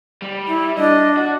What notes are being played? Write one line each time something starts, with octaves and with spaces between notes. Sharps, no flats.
G3
E4
D4 D#5
F#4